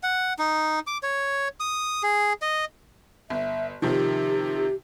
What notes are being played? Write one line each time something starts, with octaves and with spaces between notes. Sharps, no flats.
F#5
D#4
D6
C#5
D#6
G#4
D#5
G1 E5
C3 D#3 F3 G4